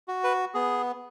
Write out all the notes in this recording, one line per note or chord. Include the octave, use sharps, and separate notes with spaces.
F#4
B4
B3 G#4